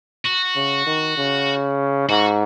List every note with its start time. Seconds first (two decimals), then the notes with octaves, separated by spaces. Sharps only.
0.25 F#4
0.55 C#3
0.86 D#3
1.17 C#3
2.09 G#2 F#4